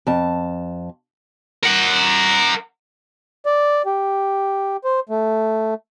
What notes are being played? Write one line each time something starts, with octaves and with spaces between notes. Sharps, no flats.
F2 A5
A#4 F#5
D5
G4
C5
A3